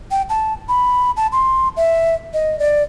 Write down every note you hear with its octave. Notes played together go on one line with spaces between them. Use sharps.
G5
A5
B5
A5
C6
E5
D#5
D5